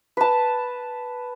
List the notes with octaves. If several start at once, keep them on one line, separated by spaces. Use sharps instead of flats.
B4 A5